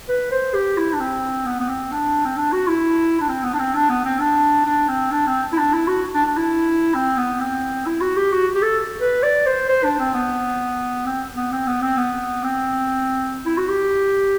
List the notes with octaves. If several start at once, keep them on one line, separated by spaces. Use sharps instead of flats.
B4
C5
G4
E4
D4
C4
B3
B3
C4
D4
C4
D4
F#4
E4
D4
C4
B3
D4
C4
D4
B3
C4
D4
D4
C4
D4
C4
E4
D4
E4
F#4
D4
D4
E4
C4
B3
C4
E4
F#4
G4
F#4
G4
A4
B4
D5
C5
C5
D4
C4
B3
C4
B3
C4
B3
C4
B3
C4
E4
F#4
G4